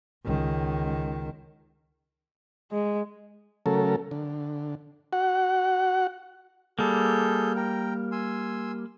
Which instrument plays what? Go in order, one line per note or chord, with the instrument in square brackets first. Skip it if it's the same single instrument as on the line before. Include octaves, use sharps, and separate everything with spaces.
[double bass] C#2 D#3
[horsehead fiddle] G#3
[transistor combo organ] C#3 F#3 A3 A4 A#4
D3
F#4 F#5
[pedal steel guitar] G3 A#3 [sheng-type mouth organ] G#4 A4 G6
[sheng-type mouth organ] A#4 G5
G#5 C6 E6